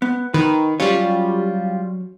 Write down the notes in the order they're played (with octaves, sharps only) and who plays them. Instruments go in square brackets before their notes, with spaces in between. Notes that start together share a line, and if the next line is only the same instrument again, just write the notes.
[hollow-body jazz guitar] B3
[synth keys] D#3 [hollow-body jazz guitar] B4
[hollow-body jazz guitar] F#3 C#4 C#5 [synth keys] G3 F4